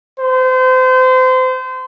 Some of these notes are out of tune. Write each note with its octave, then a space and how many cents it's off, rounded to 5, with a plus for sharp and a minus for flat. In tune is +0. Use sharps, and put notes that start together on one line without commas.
C5 -30